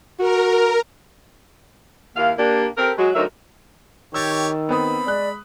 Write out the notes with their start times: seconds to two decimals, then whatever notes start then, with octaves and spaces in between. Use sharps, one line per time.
0.19 F#4 A#4
2.16 D#2 A#3 E4 F5
2.38 A#3 D4 G4
2.78 C4 G4 A4 A#4
2.98 F#3 G#3 F#4
3.15 D2 F#3 C4 D#4 A#4 E5
4.14 D#3 G4 C#5 E6 A6
4.69 B3 C4 B5 D#6
5.07 G#3 D5 F#6